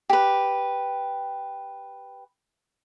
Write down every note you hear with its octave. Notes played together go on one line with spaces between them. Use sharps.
G4 B4